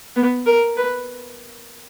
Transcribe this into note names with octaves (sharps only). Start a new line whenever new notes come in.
B3
A#4
B4